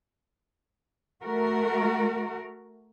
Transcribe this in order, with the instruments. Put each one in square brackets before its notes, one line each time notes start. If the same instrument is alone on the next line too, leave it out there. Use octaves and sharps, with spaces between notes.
[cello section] A3 F#4 A#4